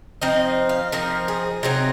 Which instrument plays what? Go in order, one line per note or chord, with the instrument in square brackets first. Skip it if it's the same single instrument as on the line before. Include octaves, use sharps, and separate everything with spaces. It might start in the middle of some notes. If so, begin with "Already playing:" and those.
[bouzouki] F3 C4 D#4 D#5
F5
F3 C4 D#4 A#4
G#4
C3 F#3 C4 D#4 G#4